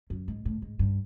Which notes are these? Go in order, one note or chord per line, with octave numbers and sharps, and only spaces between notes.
F#2
G#2
A2
G#2
G2